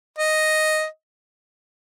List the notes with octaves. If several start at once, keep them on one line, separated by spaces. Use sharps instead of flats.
D#5